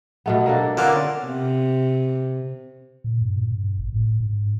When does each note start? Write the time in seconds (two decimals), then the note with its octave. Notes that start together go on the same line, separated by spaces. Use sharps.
0.26 B2 A3 B3
0.46 A#3 D4 A4
0.77 D3 A#3 B3 C#4 F4
1.25 C3
3.04 A#2
3.22 G2
3.37 A#2
3.52 G2
3.79 G#1
3.92 A2
4.20 G#2